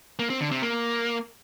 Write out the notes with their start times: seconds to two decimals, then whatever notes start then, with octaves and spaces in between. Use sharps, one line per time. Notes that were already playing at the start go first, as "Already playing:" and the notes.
0.19 A#3
0.30 C4
0.41 D3
0.51 C3
0.62 A#3